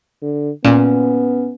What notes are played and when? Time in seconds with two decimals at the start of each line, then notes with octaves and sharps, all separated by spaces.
0.22 D3
0.65 A#2 B3 C#4